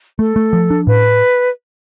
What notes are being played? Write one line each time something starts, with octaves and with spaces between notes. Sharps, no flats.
A3 A4
A3
F3
D4
A2 B4